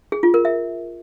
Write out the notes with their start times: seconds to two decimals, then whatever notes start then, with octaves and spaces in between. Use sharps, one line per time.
0.12 G#4
0.23 F4
0.34 A#4
0.45 E5